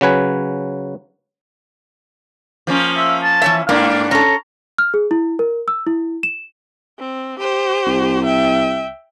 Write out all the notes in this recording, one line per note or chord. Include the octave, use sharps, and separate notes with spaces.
C#3 F#3 B4 G#5
F3 A#3 C#4
E5
A5
E3 C#5 E5
G#2 A#3 D4 F5
C#4 A4 A#5
F6
G#4
E4
A#4
E6
E4
E7
C4
G4 C5
C2
E5 G5